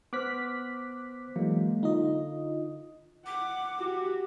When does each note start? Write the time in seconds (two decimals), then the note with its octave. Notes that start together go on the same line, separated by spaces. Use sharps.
0.13 B3 C5 D6 F6 F#6 B6
1.36 E3 F#3 G#3 A#3
1.83 D3 D#4 F4 D#5
3.26 F#5 D6
3.78 F#4 G4